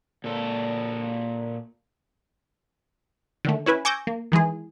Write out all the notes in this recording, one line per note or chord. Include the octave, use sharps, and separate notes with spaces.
A#2 A4
D3 D#3 A3
C#4 E4 B4 G#5
G#5 C#6 D6 E6 G6 A#6
A#3
D#3 E3 G#3 G#4